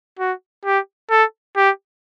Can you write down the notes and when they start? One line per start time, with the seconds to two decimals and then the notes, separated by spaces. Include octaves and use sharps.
0.19 F#4
0.65 G4
1.10 A4
1.56 G4